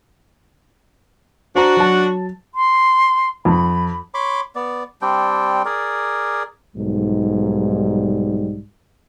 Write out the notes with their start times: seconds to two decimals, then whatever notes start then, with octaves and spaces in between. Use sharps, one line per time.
1.55 D4 F#4 C5 A#5
1.77 F#3 A5
2.55 C6
3.45 F2 B5
4.14 C#5 B5 C6 D6
4.55 B3 D5
5.02 G3 C4 D4 G5
5.65 G#4 A#4 D5
6.76 B1 G#2 G3